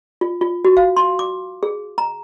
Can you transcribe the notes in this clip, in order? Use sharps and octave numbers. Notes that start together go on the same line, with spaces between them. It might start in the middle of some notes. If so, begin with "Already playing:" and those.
F4
F4
F#4
F5
C6
D6
G#4
A#5